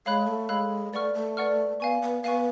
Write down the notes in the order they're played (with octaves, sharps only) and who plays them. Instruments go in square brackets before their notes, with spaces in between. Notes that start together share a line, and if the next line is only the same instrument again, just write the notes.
[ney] G#3 [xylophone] A4 C#5 F5 B5 F#6
[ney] A3
[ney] G#3 [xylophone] A4 C#5 F5 B5 F#6
[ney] A3 [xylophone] B4 D5 F#5 C#6 F6
[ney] A3
[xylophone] B4 D5 F#5 C#6 F6
[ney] B3 [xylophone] F5 G#5 C#6
[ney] B3
[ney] B3 [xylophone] F5 G#5 C#6